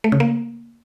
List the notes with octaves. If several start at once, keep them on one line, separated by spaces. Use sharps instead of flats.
A3
C#3
A#3